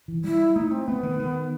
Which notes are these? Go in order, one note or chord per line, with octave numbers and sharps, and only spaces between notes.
E3
G3 E4
A3 D#4
C4
A3 B3
D#3
D#3